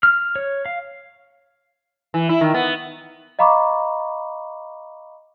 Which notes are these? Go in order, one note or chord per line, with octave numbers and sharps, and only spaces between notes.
F6
C#5
F5
E3
E4
D#3
B3
D#5 F5 A#5 B5 C#6 D6